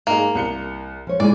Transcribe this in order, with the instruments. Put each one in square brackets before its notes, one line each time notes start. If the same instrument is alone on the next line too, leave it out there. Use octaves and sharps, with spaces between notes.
[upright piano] G#2 D#4 G#4 [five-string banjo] A#3
[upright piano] C2 C#7 G7
[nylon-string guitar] F3 C#5
[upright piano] A2 [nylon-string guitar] G#3 D#4 G#4 [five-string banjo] D5